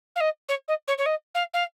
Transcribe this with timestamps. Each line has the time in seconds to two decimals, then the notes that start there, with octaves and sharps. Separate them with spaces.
0.16 F5
0.20 D#5
0.49 C#5
0.68 D#5
0.88 C#5
0.98 C#5
1.06 D#5
1.35 F5
1.54 F5